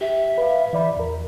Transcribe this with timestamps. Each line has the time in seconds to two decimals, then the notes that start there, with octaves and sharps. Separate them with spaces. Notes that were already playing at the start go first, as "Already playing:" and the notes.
0.01 G4 E5
0.38 B4 F5
0.73 E3 D5 B5
0.97 E2 A#4